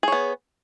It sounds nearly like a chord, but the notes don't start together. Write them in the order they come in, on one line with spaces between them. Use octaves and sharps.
G#4 C#5 B3